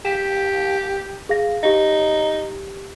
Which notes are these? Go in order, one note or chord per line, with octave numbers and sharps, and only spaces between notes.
G4 B6 E7
G#4 F5 A#6
D#4 G4 A#6